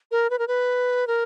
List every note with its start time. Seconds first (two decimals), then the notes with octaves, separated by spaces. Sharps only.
0.11 A#4
0.30 B4
0.39 A#4
0.48 B4
1.07 A#4